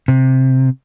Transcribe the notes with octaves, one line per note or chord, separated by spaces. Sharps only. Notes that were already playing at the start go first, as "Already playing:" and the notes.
C3